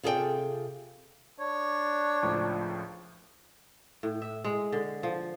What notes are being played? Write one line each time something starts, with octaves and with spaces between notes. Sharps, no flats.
C3 F4 G#4 A4 C#5 G5
D4 C#5
C#2 A2 F3
A2
E5
G#3
D3
F3